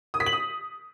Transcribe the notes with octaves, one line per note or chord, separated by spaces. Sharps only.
D#6
B6
F#7
D#6